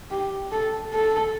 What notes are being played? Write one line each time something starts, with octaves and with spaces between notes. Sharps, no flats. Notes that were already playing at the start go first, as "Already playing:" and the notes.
G4
A4
A4